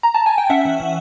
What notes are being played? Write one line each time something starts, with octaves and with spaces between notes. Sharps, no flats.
A#5
A5
G#5
G5
C#4 E5 F#5
E3
E3